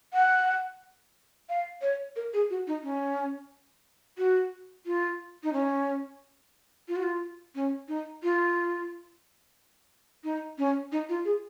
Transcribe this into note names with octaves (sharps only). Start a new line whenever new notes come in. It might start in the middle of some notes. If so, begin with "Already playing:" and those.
F#5
F5
C#5
A#4
G#4
F#4
D#4
C#4
F#4
F4
D#4
C#4
F4
F#4
F4
C#4
D#4
F4
D#4
C#4
D#4
F4
G#4